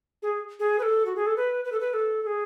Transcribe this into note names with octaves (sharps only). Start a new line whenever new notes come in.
G#4
G#4
B4
A4
F#4
G#4
A4
B4
B4
A4
B4
A4
A4
G#4